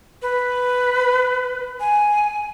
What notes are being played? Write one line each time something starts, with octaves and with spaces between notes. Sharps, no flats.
B4
G#5